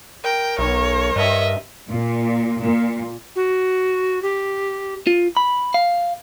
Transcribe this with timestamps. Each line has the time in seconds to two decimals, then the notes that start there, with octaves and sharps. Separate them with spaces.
0.24 A#4 G5
0.58 B1 C#5
1.16 G2 D#5 E5
1.89 A#2
2.61 A#2
3.36 F#4
4.22 G4
5.07 F4
5.37 B5
5.74 F5